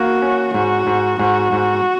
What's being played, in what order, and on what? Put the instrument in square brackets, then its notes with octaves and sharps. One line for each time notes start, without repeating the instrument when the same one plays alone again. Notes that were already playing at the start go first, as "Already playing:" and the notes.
Already playing: [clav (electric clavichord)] A#3 [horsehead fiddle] F#4
[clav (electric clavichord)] C#4
[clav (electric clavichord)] G#2 [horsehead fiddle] F#4
[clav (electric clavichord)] G#2
[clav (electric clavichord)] G#2 [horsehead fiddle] F#4
[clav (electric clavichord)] G#2